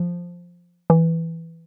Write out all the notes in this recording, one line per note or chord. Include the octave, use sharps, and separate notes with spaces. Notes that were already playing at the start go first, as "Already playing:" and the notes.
Already playing: F3
E3